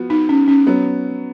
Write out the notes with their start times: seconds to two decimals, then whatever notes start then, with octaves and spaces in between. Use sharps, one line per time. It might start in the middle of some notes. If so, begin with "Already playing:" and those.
Already playing: F3 B3 F#4
0.10 D#4
0.29 C#4
0.48 C#4
0.66 F#3 B3 F#4